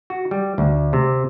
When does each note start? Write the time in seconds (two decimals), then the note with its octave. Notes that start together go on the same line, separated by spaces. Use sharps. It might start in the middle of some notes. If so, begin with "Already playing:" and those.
0.10 F#4
0.31 G3
0.58 D2
0.93 C3